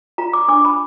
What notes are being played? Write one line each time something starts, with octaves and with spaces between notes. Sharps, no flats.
F4 A#5
D6
D4 D6
B5